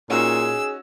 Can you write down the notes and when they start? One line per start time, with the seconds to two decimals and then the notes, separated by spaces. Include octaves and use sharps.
0.10 A#2 C#4 D#4 F#4 G#4 E6